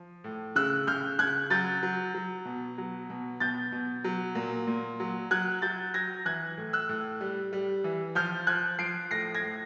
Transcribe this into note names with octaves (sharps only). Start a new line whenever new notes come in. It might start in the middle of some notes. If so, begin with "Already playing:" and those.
Already playing: F3
A2
C#3 E6 F#6
C#3 F6 G6
C#3 F#6 G#6
F#3 G6 A6
F#3
F#3
B2
F#3
B2
B2 G6 A6
B2
F#3
A#2
A#2
F#3
F#3 F#6 G#6
F#3 G6 A6
F#3 G#6 A#6
E3 F#6 G#6
A2
E6 F#6
A2
G3
G3
E3
F3 F6 G6
F3 F#6 G#6
F3 C7 D7
A2 A#6 C7
G#6 A#6
A2